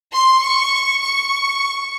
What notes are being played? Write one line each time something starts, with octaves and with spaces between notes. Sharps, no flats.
C6
C#6
C#6